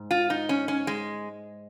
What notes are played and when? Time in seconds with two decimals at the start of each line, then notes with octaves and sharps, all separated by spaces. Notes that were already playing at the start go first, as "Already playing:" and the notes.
Already playing: G#2
0.11 F4
0.30 D#4
0.49 C#4
0.68 C#4
0.87 G#3